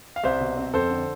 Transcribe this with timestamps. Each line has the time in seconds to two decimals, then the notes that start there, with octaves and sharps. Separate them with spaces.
0.16 F5
0.23 C2 C5 E5
0.41 B2
0.57 C4
0.73 F2 A4 C5
0.90 D3